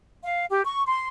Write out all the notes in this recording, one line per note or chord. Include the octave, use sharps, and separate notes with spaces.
F5
G4
C#6
C6